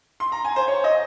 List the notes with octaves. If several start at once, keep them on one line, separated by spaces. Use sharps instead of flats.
C6
A#5
G#5
C5
C#5
D#5